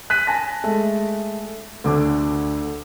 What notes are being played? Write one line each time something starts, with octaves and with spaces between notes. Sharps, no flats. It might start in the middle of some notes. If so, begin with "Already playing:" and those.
F#6 B6 D#7
G#5 A5 A#6
G#3 A3
D2 D3 D6